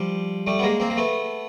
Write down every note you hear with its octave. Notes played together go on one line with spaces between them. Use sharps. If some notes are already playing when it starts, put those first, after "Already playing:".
Already playing: F3 G3
G3 A3
B3
G#3 A#3
A#3 C4
A#3
A3 B3